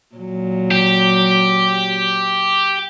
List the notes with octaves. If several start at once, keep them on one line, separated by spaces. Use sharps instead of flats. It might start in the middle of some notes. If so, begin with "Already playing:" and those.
A#2 F#3
G4